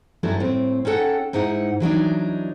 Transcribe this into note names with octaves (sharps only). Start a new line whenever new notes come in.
G2 F#3 A3 C#4 D#4 E4
A2 C4
C#4 D#4 A4 F#5 G5
G#2 D#4 E4 F#5
E3 F#3 D4 D#4